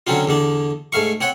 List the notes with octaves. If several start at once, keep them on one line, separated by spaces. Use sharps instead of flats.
D3 F#3 C4 C#4 F4
E2 D3 D4
G#2 A3 F5 C#6
C4 C#5 F#5